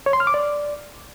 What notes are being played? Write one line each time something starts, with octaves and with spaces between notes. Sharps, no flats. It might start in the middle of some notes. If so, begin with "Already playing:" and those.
C#5
C6
F6
D6
D5